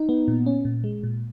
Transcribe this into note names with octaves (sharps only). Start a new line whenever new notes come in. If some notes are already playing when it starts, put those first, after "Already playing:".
Already playing: D#4
B3
A#2
C#4
A#2
G#3
A#2